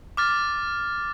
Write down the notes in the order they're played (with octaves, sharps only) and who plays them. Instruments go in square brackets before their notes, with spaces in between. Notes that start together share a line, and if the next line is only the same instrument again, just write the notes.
[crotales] D6 F6 A6